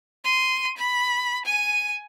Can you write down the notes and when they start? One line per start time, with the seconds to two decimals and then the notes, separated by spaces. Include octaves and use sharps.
0.24 C6 D#7
0.78 B5
1.46 G#5 D#7